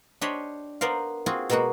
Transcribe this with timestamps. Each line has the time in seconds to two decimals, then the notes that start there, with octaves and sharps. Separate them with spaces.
0.21 D4 G4 C5 C#5 D#5 B5
0.81 B3 A#4 C5 D5 F5
1.26 C4 F4 F#4 G#4
1.50 B2 G#3 A#3 B3 F#4